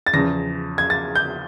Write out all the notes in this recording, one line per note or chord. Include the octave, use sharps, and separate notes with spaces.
A6
E2 C#3 F3 A#6
G#6
A6
G6